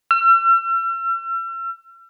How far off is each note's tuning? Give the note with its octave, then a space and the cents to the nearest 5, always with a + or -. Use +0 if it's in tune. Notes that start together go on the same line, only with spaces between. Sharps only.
E6 +45